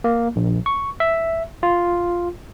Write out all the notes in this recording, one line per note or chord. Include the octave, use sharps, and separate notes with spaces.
A#3
A#1
C#6
E5
F4